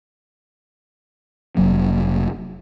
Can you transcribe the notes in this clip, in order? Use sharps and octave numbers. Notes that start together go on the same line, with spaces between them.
F1 F#3 A#3